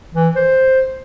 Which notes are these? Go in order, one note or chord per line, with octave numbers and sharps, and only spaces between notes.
E3
C5